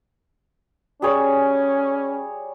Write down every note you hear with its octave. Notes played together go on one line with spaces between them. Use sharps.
G3 C#4 G#4 C#5